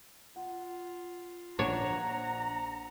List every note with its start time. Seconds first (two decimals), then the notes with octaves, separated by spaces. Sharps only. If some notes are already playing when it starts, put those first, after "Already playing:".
0.36 F4 F#5
1.59 A#1 D4 C#5 F#5 A#5 E7